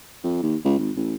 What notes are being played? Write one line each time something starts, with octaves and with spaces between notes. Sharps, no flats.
F2
D#2
C#2
G#1
A1